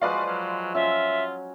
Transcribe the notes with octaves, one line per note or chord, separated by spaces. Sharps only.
F3 G#3 F4 F#4 B4 D5 F5
F#3
F#3 C#4 F4 E5 E6